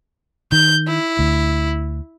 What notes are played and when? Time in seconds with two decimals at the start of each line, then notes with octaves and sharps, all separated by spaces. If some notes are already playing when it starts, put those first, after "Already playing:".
0.52 D#3 G6
0.87 E4
1.19 D2